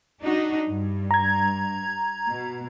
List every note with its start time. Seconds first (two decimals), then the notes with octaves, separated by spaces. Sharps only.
0.22 D4 D#4 F#4
0.68 G2
1.11 A#5 G#6
2.28 B2